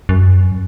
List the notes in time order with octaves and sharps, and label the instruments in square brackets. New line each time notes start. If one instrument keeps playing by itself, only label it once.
[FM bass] F#2